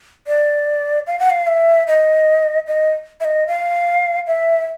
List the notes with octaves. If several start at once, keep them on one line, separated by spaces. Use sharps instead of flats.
D5
F5
F#5
F5
E5
D#5
D#5
E5
D#5
F5
E5